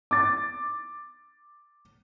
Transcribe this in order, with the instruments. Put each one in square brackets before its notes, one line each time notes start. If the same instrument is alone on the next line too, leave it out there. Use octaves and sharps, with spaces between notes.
[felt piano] D6 A6